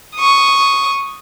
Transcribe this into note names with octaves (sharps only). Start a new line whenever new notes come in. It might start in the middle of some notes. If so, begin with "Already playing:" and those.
C#6 D#6